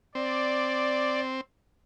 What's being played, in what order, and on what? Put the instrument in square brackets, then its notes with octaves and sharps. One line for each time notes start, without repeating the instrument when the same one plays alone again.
[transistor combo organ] C4 [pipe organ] D5